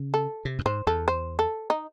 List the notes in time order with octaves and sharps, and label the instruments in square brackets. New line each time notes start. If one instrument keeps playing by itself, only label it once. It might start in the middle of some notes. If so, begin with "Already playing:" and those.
Already playing: [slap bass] C#3
[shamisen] A4
[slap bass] C3
F#2
[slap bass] G#2 [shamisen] C5
[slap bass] E2 [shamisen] A4
[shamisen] C5
A4
D#4